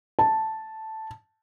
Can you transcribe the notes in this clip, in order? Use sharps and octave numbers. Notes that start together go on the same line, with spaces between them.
A5